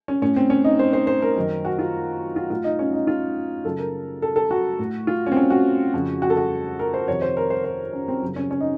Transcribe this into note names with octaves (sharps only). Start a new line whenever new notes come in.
C#4
A2 C#4
C4
C#4
D#4
C5
C5
C5
A#4
F#2 D#3
F#4
F4
F4
A2 F4
D#4
C#4
D#4
F4
F#2 C#3 A4
A#4
A4
A4
F#4
A2
F4
C#4
C4
C#4
F#4
F2 C#3
F#4
A4
F#4
A#4
C5
F2 C3 D#3 C#5
C5
A#4
C5
C5
C#4
C4
F#2 C#3
C#4
C#4
D#4